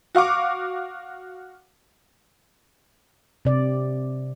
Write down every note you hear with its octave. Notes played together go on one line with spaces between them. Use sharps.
F#4 F5 C#6 D6
C3 D5